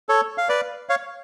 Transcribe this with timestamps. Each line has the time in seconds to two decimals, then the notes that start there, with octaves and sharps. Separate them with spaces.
0.09 A4 C#5
0.38 F5
0.49 B4 D5
0.89 C#5 F5